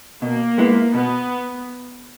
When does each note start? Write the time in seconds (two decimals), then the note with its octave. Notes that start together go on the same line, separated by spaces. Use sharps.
0.22 B2 A#3
0.58 G#3 B3 E4
0.94 B2 B3